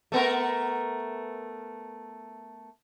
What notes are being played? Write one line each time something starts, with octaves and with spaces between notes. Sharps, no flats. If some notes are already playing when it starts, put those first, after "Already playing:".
A3 B3 A#4